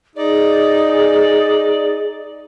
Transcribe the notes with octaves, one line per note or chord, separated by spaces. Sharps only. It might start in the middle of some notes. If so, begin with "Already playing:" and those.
D#4 G#4 D5